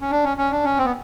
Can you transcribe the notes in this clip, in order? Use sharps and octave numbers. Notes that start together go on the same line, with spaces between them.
C#4
D4
C#4
C#4
D4
C#4
C4
B3